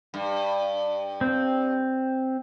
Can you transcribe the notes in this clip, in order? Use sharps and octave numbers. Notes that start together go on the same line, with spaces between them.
G2
C4